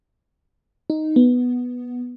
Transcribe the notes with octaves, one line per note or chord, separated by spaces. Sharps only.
D#4
B3